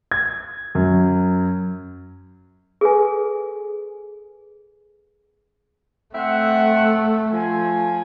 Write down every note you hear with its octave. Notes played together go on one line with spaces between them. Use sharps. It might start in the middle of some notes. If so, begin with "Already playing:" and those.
G#6
F#2
G#4 A4 B4 G#5
A3 C4 E5 F#5
F3 G#5